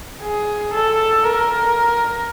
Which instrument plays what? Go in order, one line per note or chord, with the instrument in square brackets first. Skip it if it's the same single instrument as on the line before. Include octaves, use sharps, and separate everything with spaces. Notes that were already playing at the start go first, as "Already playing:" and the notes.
[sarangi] G#4
A4
A#4